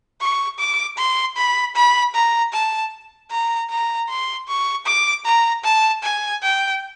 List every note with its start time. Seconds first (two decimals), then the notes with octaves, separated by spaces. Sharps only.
0.21 C#6
0.59 D6
0.98 C6
1.37 B5
1.76 B5
2.15 A#5
2.53 A5
3.31 A#5
3.70 A#5
4.10 C6
4.48 C#6
4.87 D6
5.25 A#5
5.65 A5
6.03 G#5
6.43 G5